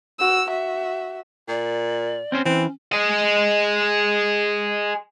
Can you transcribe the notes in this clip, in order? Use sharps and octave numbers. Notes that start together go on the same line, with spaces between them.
F#4 E6
F#4 E5
A#2 D5
C4 C#4 C5
E3 C4 C#4
G#4 D#5